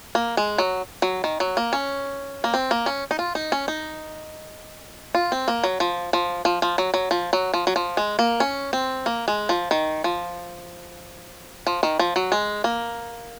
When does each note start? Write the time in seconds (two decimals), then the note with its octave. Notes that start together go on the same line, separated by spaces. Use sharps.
0.15 A#3
0.37 G#3
0.58 F#3
1.02 F#3
1.24 D#3
1.40 F#3
1.57 A#3
1.73 C#4
2.44 A#3
2.54 C4
2.71 A#3
2.86 C#4
3.11 D#4
3.19 F4
3.35 D#4
3.52 C#4
3.68 D#4
5.15 F4
5.32 C4
5.48 A#3
5.64 F#3
5.80 F3
6.13 F3
6.45 F3
6.62 F3
6.78 F#3
6.94 F#3
7.11 F3
7.33 F#3
7.54 F3
7.67 F#3
7.76 F3
7.97 G#3
8.19 A#3
8.40 C#4
8.73 C4
9.06 A#3
9.28 G#3
9.49 F3
9.71 D#3
10.04 F3
11.67 F3
11.83 D#3
11.99 F3
12.16 F#3
12.32 G#3
12.64 A#3